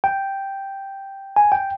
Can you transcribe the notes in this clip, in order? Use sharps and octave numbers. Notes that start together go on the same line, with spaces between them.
G5
G#5
G5